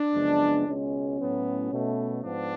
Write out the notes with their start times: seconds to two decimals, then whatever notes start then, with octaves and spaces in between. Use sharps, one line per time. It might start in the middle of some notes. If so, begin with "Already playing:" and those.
Already playing: D4
0.14 F#2 C#3 F3 G#3 B3
0.66 C#2 B2 G#3 C#4
1.19 A2 F#3 B3
1.71 B2 A3
2.24 G#2 F3 B3 D4